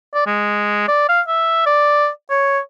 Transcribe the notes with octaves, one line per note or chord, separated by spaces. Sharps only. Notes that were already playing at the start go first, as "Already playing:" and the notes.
D5
G#3
D5
F5
E5
D5
C#5